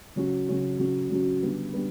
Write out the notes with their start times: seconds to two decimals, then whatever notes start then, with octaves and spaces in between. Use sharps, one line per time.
0.16 C#3 F#3 C#4 F#4
0.48 C#3 F#3 C#4 F#4
0.79 C#3 F#3 C#4 F#4
1.09 C#3 F#3 C#4 F#4
1.41 D3 G3 B3 D4
1.73 G3 B3 D4